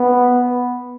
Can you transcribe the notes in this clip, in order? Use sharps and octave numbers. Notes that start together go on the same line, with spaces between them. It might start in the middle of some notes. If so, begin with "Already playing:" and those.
Already playing: B3